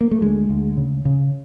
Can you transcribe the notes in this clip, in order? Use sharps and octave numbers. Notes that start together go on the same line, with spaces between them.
A#3
A3
D2 G#3
D2
C#3
C#3